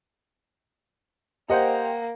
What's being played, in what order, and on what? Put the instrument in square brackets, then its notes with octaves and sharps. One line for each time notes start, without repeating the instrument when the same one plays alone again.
[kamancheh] A#3 [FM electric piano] G4 C5 G5 [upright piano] D#5 F#5